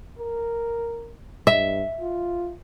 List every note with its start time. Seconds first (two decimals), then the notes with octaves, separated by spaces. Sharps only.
0.19 A#4
1.47 G2 E5
2.01 F4